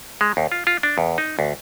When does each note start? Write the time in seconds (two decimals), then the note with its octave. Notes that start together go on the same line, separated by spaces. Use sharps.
0.21 G#3
0.37 D#2
0.52 F4
0.67 F4
0.83 D4
0.98 E2
1.18 D#4
1.39 D2